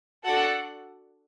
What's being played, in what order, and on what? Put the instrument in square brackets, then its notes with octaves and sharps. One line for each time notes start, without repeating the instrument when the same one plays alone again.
[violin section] D4 F#4 A4 F#5